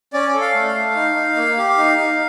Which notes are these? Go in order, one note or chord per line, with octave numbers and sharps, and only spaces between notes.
C#4 D5
A4
F5
A3
F5
A3
D#4
D#4
A#3
G4
D#4
D#4